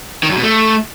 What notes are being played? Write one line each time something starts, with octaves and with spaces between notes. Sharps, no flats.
D#3
F#2
B2
A3